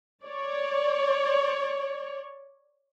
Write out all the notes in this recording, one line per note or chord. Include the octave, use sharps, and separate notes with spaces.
C#5 D5